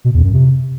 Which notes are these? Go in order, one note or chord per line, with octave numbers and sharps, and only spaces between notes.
B2
E2
F#2
C3